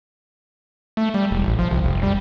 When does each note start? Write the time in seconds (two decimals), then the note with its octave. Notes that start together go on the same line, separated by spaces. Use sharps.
0.97 A3
1.14 G3
1.31 E1
1.44 A1
1.59 F3
1.71 C2
1.84 F1
2.03 G3